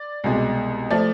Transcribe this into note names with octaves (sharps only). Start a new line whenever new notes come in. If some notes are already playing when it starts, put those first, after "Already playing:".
Already playing: D5
C2 B2 G#3
F3 A3 D5